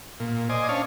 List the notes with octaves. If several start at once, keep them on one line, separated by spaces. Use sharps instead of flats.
A#2
C5 D5 D#5 G#5
C#4 D4 C#5 F5 A5